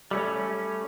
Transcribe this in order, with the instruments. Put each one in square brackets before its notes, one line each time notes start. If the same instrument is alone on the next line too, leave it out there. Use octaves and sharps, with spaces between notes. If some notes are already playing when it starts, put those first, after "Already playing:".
[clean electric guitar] G3 A3 C#4